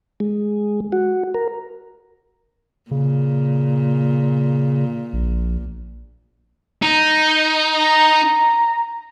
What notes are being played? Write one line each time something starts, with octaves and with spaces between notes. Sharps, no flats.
G#3
F#4
A#4
A#2 C#3
A#1
D#4
A#5